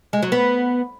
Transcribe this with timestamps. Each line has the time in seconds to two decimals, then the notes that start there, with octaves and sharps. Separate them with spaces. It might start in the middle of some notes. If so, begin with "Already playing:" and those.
0.13 G#3
0.22 F#3
0.32 B3